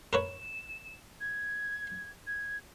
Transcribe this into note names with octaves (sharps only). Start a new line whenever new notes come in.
A#4 B4 C#5 E7
G#6
G#6